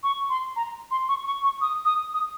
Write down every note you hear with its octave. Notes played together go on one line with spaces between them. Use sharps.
C#6
C6
A#5
C6
C#6
C#6
C#6
D#6
D#6
D#6